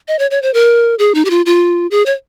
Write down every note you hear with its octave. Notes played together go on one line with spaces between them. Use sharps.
D#5
C#5
C#5
C5
A#4
G#4
D#4
G4
F4
F4
G#4
C#5